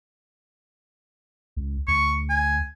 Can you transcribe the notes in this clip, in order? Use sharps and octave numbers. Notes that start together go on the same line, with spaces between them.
C#2
D2 C#6
G#5